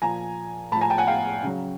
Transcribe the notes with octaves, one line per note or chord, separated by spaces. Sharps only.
A#2 F3 G#5 A#5
A2 F3 A5 B5
G#5 A#5
G5 A5
F#5 G#5
F5 G5
C#3 F#3